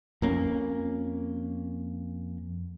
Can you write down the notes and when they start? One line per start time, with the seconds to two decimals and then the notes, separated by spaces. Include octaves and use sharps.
0.22 F2 A#3 C#4